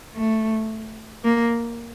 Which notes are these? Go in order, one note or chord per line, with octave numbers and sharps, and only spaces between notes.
A3
A#3